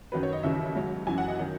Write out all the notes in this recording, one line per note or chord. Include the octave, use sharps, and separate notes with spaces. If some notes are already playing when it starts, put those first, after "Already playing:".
F#2 D#3 F#3 B4
C#5
D#5
D#2 C#3 E3 E5
G#2 F#3
F#2 E3 G#5
F#5
D#5
D#3 F#3